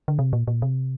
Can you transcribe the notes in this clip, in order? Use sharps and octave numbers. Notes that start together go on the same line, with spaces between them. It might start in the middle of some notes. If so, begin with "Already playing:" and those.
D3
C3
A#2
A#2
C3